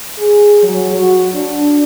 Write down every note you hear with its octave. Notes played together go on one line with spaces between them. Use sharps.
G#4
F#3
F#4
D4